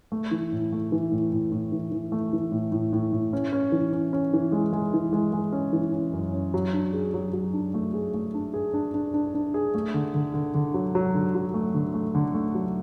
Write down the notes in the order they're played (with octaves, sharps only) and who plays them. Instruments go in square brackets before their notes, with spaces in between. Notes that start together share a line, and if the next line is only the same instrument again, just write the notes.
[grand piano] A3
E3
A2
A3
E3
A2
A2
A2
E3
E3
A3
E3
A2
A2
A2
A2
C#4
C#4
E3
C#4
C#4
E3
G#3
G#3
E3
G#3
G#3
C#4
E3
C#4
F#2
C#4
F#3
D4
G#4
F#3
F#3
D4
A3
G#4
A3
D4
G#4
D4
D4
D4
D4
G#4
A3
D3
D3
D3
D3
F#3
F#3
D3
F#3
A3
D3
A3
D3
A3
F#3